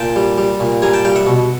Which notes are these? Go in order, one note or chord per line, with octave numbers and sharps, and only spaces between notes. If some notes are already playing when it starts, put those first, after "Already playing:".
Already playing: A#2 G5 A5
G3
G3
A#2
G3 G#5 A#5
G5 A5
G3 F5 G5
E5 F#5
B2